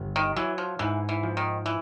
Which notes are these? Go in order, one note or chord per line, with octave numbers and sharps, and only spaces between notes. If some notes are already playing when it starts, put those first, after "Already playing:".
Already playing: G1
D#3
E3 F#3
F3
G#2 E3
E3
F3
D#3
E3